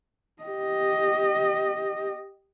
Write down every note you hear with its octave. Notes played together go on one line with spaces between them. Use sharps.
G4 D#5